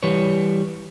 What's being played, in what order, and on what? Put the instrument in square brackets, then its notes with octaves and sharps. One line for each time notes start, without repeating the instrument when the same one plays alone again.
[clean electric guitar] E3 G3 B4 C#5